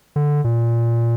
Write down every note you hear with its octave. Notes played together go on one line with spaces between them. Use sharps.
D3
A#2